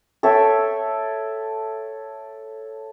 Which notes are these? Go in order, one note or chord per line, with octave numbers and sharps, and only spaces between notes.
A4 C#5 E5 G5